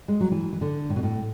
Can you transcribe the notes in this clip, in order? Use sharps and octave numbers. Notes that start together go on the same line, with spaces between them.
G#3
F#3
E3
E3
D3
A2
B2
A2